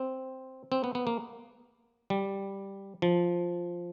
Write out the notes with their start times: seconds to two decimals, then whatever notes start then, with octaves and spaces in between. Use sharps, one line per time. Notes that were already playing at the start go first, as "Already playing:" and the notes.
Already playing: C4
0.72 C4
0.84 B3
0.95 B3
1.07 A#3
2.10 G3
3.02 F3